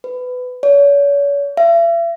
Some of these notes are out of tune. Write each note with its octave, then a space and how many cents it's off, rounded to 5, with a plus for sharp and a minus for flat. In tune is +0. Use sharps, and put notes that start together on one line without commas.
B4 +20
C#5 +40
E5 +40